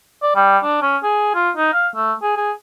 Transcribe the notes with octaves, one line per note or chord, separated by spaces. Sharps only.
D5
G3
D4
C#4
G#4
F4
D#4
F5
A3
G#4
G#4